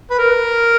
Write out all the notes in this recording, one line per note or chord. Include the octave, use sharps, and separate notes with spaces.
B4
A#4